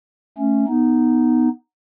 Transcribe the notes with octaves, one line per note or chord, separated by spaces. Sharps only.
A3 C#4
B3 D#4